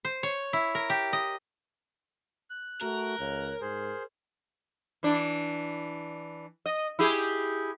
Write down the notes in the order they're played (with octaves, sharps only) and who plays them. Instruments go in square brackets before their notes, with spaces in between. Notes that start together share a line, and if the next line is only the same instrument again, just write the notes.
[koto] C5
C#5
E4
A#4
G4
D#5
[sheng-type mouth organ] F#6
[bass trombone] A3 [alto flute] F#4 [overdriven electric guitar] A#4
[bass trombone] C#2 [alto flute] C#5
[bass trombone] G#2 [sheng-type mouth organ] G#4 C5 [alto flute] A#4
[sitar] E3 D4
D#5
E4 G4 G#4